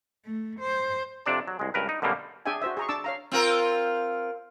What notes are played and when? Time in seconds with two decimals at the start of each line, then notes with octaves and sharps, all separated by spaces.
0.25 A3
0.60 C5
1.26 F2 C3 D4 D5 A5
1.48 F#3
1.59 C2 G#3
1.74 C#2 G2 A#4 B4
1.89 D#4
2.02 F#2 B2 D3 G3 A#3
2.46 D4 G#4 D5 E5 G5 G#5
2.62 F#4 C5 E5
2.77 G#4 A#5 C#6
2.89 D4 A5 D6 E6
3.04 C#5 F5 A#5
3.32 C4 F4 A#4